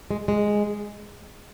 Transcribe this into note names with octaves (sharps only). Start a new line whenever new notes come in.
G#3
G#3